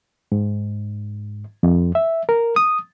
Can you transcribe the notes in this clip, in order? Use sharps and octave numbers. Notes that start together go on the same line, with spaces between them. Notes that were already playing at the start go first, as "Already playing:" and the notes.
G#2
F2
E5
A#4
D#6